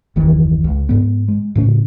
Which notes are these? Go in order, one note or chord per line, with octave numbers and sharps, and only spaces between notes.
F#1 D#2 D#3 E3
C#2
G#2 B3
G#3
A2 C#3 C#4